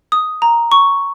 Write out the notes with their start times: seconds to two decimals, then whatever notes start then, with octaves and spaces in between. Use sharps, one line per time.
0.12 D#6
0.42 A#5
0.72 C#6